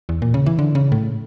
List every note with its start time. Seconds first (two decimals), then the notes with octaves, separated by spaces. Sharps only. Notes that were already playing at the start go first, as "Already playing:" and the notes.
0.09 E2
0.22 A#2
0.34 C#3
0.46 E3
0.59 D3
0.75 C#3
0.92 A2